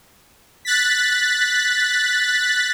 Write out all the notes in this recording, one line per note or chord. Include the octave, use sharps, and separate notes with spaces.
F#6 A6 B6